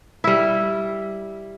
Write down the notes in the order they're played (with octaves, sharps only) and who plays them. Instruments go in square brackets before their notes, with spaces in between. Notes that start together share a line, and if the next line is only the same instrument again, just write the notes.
[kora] G3 E4